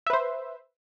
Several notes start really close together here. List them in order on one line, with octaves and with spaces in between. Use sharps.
E5 B4 C5